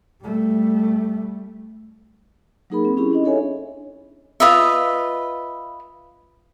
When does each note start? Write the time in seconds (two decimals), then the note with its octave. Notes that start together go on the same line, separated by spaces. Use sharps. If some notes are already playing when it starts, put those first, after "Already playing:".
0.22 G3 A3
2.70 F#3 A#3 D#4 G#4 A#4 B5
2.85 C4
2.97 C#4 D#4 E4 G4 G#4
3.12 C#4 D4 D#5
3.24 D4 G#4 A4 C#5 E5 G#5
4.40 F4 B4 D#5 E5